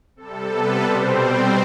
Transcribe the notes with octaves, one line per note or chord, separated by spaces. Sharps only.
C3 G3 A4
B3 B4
B2 G3 C4 C5
C4 C5